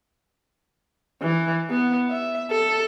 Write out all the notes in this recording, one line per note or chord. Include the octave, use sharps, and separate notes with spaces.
E3
B3
E5
A4